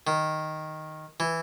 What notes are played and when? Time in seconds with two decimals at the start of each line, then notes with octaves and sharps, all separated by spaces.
0.07 D#3
1.20 E3